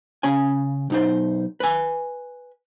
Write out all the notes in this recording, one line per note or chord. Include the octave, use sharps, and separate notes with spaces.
C#3 C#4 G#5
B1 D#4 C5
B4 G#5